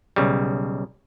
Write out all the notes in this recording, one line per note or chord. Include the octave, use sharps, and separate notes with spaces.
B1 C#3 G3